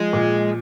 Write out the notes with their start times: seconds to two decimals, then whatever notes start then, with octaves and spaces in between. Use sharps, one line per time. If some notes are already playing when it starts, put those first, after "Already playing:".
Already playing: F3 G#3
0.13 A#2